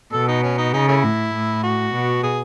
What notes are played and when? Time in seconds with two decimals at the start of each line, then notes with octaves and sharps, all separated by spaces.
0.13 B2 A4
0.28 D#4
0.43 C#4
0.58 D#4
0.73 C#3 D#4
0.88 A3 C#4 E4
1.03 A2
1.34 A2
1.63 F#4
1.94 B2
2.23 G#4